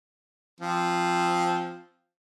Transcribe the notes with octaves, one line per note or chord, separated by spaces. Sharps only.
F3 C4